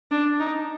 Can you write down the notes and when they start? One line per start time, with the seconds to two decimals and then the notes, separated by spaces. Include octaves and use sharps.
0.11 D4
0.40 D#4